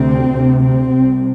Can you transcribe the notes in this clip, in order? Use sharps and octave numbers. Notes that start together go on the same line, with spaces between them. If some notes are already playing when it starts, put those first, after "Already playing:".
Already playing: D2 C3 C4
D2 C3
C4
C2 C3